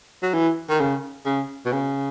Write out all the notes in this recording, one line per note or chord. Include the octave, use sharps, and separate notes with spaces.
F#3
E3
D#3
C#3
C#3
B2
C#3